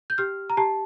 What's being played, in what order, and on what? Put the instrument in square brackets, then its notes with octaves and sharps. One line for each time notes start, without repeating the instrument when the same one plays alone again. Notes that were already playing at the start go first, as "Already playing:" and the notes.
[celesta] G6
G4 F6
A#5
G4 A5